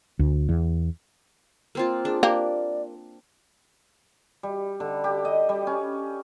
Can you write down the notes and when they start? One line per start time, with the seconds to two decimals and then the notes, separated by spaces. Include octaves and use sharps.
0.19 D2
0.49 E2
1.75 A#3 C4 F4
2.05 D4 G#4
2.23 A#3 G4 D5
4.43 G3
4.80 D3
5.04 G4
5.25 D#5
5.49 G3
5.67 C#4